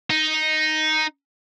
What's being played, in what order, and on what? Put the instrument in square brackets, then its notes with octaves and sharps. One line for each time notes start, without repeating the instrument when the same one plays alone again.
[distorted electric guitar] D#4